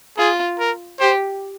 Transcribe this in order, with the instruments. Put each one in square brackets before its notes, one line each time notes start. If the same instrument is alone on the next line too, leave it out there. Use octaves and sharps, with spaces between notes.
[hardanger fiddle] F4 [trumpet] G#4
[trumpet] A#4
[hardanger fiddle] G4 [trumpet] C5